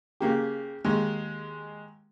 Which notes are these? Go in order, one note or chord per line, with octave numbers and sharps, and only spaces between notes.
C#3 A#3 G4
D#2 G#3